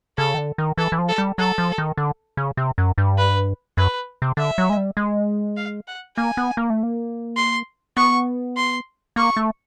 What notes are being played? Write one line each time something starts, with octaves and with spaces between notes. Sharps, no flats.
C#3 A4
D#3
D3
D#3
E3 A4
E3
F3
A4
G3
F#3 A4
F3
D#3
D3
C#3
C3
F#2
G2
B4
F#2 B4
C3
D3 E5
F#3
G#3
G3
G#3
F5
F#5
A#3 G#5
B3
A#3
A3
A#3
C6
B3 C#6
C6
A#3 C#6
A3